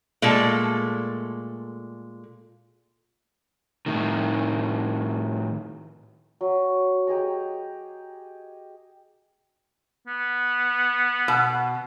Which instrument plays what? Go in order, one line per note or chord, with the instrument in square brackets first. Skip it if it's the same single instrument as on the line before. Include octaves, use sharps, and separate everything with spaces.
[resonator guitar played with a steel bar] A#2 G#3 A3 A4
[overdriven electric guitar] A2 D#3
[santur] F#3
G4 G#4 D#5 A#5
[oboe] B3
[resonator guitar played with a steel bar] B2